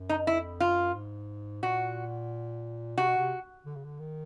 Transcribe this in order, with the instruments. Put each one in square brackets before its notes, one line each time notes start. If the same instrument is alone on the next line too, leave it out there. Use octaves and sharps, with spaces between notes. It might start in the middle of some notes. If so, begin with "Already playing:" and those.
Already playing: [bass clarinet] F#2
[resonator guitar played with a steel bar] D#4
[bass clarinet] F2 [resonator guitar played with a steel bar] E4
[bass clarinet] F#2 [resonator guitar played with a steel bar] F4
[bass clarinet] G#2
[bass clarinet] A#2 [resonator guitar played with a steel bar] F#4
[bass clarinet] C3 [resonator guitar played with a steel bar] F#4
[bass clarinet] B2
C3
D3
C#3
D3
D#3